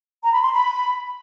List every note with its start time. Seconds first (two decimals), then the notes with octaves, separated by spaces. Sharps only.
0.23 A#5
0.33 B5
0.42 C6
0.52 B5